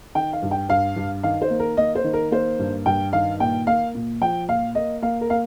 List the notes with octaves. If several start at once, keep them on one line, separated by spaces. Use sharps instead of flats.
D#3 G5
F5
G2
G5
G2 F5
G2
D#3 F5
C5
A#3
A#4
A#3 D#5
C5
D#3
A#4
A#3 C5
G2
G2 G5
D#3 F5
A#2 G5
A#3 F5
A#2
F3 G5
A#2 F5
A#3 D#5
A#3 F5
A#4
A#3 F5